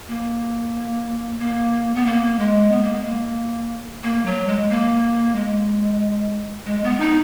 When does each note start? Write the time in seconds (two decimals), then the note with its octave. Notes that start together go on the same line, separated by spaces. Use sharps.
0.08 A#3
1.39 A#3
1.95 B3
2.06 A#3
2.39 G#3
2.71 B3
2.83 A#3
2.93 G#3
3.05 A#3
4.03 A#3
4.26 F#3
4.48 G#3
4.70 A#3
5.36 G#3
6.66 G#3
6.84 B3
7.00 D#4